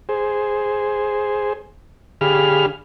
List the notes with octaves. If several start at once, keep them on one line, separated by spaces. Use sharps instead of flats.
G#4 C5
D3 G4 G#4 F5 B5 F6